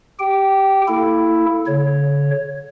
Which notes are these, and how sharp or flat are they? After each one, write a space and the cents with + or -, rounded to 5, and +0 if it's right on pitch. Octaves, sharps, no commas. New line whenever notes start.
G4 +0 G5 -20
A#3 -30 E4 +0 A4 +0
D3 -45 C#5 +0